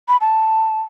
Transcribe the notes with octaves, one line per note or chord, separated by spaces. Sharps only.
B5
A5